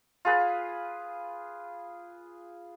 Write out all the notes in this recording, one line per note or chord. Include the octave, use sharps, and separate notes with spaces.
F4 G#4 B4